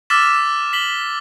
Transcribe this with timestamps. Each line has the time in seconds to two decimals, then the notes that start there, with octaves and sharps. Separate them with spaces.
0.10 D6 E6 F6 A6 B6 E7
0.73 B6 F#7 G7